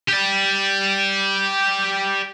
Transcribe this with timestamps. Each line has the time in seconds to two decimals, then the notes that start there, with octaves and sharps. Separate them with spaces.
0.09 G4 D5